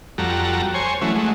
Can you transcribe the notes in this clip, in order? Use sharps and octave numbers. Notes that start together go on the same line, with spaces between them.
F2 G3 F#4 A4 A#5
C5 C#5 G#5
E3 F#3 A3 C#4
F#3 G#3 A3